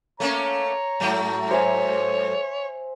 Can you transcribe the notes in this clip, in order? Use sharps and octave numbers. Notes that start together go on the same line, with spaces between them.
A3 A#3 C#4 C#5 A#5
G#2 F#3 A3
C5 C#5 E5 G#5